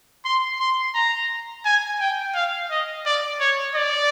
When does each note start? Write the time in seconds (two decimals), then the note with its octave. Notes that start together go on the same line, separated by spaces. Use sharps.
0.25 C6
0.60 C6
0.94 A#5
1.65 G#5
2.00 G5
2.35 F5
2.71 D#5
3.06 D5
3.40 C#5
3.75 D5